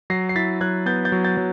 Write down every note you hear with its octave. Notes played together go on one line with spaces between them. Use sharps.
F#3 A#6 C7
C7
E4 A6 B6
F#3 F#6 G#6
B3 G6 A6
G6 A6
F#3
G6 A6
F#3